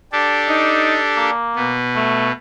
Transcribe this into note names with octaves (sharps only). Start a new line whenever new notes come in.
D4 G4 A4
D#4
A#3
B2 B3
A3